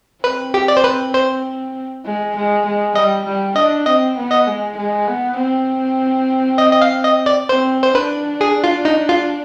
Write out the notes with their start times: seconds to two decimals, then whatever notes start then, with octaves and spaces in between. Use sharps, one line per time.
0.24 C4 B4
0.54 G4
0.68 D5
0.77 C5
0.84 B4
1.14 C5
2.05 G#3
2.36 G#3
2.66 G#3
2.96 G3 D#5
3.25 G3
3.56 D4 D#5
3.86 C4 D#5
4.17 B3
4.32 D#5
4.47 G#3
4.77 G#3
5.08 B3
5.37 C4
6.58 D#5
6.72 D#5
6.82 F5
7.04 D#5
7.26 D5
7.49 C4 C5
7.83 C5
7.94 D4 B4
8.41 G#4
8.64 F4
8.85 D#4
9.09 F4